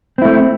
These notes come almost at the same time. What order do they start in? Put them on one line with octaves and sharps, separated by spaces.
C4 E4 A3